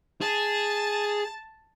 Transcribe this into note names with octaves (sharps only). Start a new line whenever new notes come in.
G#4 A5